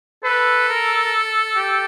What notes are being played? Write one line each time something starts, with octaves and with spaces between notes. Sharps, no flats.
A4 B4
A#4
G4